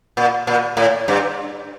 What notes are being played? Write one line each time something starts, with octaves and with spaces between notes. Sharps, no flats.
A#2
A#2
A2
G2